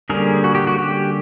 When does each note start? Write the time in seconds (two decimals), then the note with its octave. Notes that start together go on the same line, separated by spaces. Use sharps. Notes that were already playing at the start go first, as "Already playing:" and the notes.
0.10 D3 G3 A#3 C#4 G#4 A#4
0.44 F#4
0.55 G4
0.67 F#4
0.78 G4